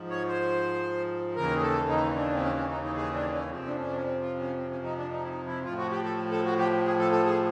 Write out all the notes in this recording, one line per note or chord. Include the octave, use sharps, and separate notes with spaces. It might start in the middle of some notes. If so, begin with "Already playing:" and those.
Already playing: G#2 F3
C#5
C5
D#2 C#3 E3 A#4
G#4
A4
D#4
D4
C4
C#4
C#4
D#4
D#4
G#4
D4
C#4
F2 C3 F3 C4
D4
C#4
D4
C#4
C4
F4
C#4
C4
C#4
D#4
D4
D#4
E4
D#4
E4
A2 F3 F4
F#4
G4
A4
A4
F#4
G4
G#4
A4
A4
G#4